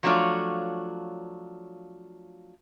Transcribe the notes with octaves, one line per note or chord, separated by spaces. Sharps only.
F3 F#3 A3 D4 F4 C#5